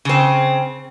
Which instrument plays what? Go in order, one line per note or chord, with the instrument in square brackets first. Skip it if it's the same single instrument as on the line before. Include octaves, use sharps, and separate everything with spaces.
[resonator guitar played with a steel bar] C#3 C4